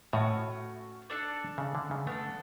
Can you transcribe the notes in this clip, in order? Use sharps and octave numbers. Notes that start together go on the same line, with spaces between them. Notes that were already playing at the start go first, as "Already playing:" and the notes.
A2 A3 C#4 F#4
D4 A4 D5
C#3
D3
C#3
A3 B3 D4 A4